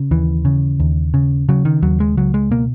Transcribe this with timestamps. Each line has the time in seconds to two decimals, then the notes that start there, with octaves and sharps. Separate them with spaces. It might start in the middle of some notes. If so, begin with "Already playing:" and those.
Already playing: C#3
0.11 D#2 E3
0.45 C#3
0.80 D#2
1.14 C#3
1.49 C#3 F#3
1.65 D#3
1.82 D#2 F#3
2.00 G#3
2.17 C#2 F#3
2.34 G#3
2.51 B2 A#3